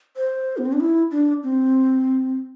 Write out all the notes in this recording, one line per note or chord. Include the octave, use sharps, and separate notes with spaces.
C5
B3
C4
D4
E4
D4
C4